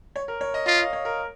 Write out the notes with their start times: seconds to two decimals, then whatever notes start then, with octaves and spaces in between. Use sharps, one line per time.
0.16 C#5
0.28 A#4
0.41 C#5
0.54 D#5
0.66 F4 D#5
0.79 F5
0.93 C#5
1.05 A#4